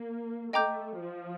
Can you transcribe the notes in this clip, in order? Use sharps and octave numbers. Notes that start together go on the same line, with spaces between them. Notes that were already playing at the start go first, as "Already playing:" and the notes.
Already playing: A#3
A3 D#5 G5 A#5 D6 G6
F3